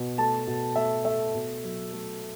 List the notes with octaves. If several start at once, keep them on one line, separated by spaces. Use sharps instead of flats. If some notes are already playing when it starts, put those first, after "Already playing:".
Already playing: B2
A3 A5
B2
A3 E5
A3 E5
B2
F#3
A3